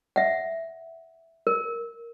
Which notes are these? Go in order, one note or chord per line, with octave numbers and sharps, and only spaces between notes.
E5 F#5
A#4